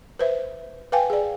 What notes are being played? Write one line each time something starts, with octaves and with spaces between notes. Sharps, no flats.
B4 C5 E5
B4 F5 G5 G#5
G#4 D5